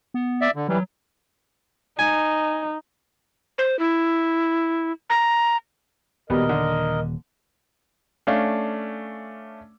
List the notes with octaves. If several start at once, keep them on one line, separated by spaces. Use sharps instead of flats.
B3
D5 E5
D3
E3 F#3 G3
D#4 G#5
C5
E4
A#5
D#1 B2 G3 B3 A#4 D#5
D3
A3 C#4 D4 F5